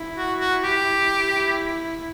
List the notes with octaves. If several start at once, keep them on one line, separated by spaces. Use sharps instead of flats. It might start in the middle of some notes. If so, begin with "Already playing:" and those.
Already playing: E4
F#4
F#4
G4
E4